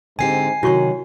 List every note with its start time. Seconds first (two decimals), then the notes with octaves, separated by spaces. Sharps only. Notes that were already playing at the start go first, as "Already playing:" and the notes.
0.19 G#2 D3 C4 G4 G#5 C7
0.63 C3 D#3 F#3 E4 F#4 C#6